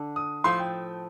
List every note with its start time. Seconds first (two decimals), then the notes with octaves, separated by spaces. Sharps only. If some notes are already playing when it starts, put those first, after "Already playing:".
Already playing: D3 D4
0.16 D#6
0.44 A2 F3 A3 C6
0.59 G5